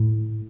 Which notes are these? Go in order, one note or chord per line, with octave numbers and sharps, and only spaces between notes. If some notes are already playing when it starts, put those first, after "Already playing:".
Already playing: A2